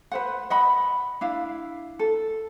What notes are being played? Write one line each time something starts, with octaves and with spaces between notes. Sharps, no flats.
B4 C5 F#5
D#5 F#5 B5
D4 E4 F5
A4